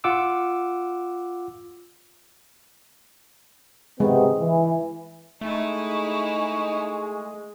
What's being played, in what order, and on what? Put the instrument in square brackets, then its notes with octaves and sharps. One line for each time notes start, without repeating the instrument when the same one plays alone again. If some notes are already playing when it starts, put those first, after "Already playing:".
[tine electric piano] F4 F#5 D6 E6
[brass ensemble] C3 D#3 B3 [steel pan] G#3
[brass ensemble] E3
[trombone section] G#3 [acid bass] A3 [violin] D#4 E4 [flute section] G#5 C#6